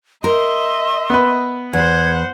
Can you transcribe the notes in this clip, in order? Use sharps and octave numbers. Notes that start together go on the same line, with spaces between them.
A#4 D#5 E5 C6
B3 B4
E2 C5 F#5 G#6